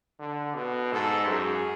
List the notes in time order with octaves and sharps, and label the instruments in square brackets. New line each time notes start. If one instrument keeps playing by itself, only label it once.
[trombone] D3
B2
[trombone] G#2 [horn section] A4
[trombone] F#2 [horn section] G#4